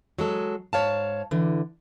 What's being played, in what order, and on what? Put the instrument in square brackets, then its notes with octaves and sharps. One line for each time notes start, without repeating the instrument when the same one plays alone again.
[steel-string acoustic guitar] F#3 G#3 A4
G#2 C#5 F5 A5
D3 E3